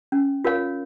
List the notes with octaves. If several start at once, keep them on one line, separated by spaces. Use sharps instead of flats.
C#4
F4 A#4 C#5 F5